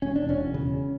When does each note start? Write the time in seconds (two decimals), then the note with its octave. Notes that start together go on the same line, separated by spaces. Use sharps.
0.02 E1 C#4
0.16 D4
0.29 E1 C#4
0.54 C#3